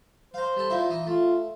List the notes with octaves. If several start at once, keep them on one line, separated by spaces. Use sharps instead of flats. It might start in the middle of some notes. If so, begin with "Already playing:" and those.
C5 F5 A#5
G3 A4
A#2 A#3 E4
E3 D#4
A3 F4